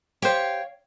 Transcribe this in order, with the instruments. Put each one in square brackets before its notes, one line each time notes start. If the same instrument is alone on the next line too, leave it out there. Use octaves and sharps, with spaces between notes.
[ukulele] G4 C5 [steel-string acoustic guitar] C#5 F5 G5